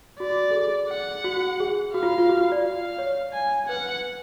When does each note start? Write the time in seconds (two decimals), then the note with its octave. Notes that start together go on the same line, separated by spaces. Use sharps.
0.20 F#4 D5
0.51 A4
0.55 G#4
0.90 F#5
1.24 F#4
1.37 F#4
1.60 G#4
1.94 F#4 F5
2.03 F4
2.18 F4
2.29 F#4
2.41 F4
2.52 D5
2.65 F5
2.98 C#5
3.33 G#5
3.68 B4 F#5